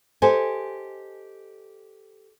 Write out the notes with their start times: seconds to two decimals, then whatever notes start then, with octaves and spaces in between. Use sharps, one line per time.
0.22 G4 A4 C5 D#5 G#5